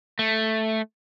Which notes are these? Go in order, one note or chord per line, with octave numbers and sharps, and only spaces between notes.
A3